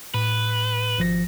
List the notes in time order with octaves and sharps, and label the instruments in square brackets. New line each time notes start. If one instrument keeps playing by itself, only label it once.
[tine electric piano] A2 [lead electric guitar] B4
[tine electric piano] G#1 F3 A#6